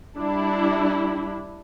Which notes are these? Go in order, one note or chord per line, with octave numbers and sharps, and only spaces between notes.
G3 D4 E4